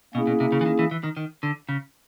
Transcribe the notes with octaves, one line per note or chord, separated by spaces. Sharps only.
B2 A#3 C#4 E4 G#4
B2
C3
C#3
E3
D#3
E3
E3
D#3
D#3
D3
C#3